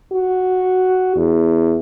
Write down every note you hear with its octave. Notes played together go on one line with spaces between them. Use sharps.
F#4
E2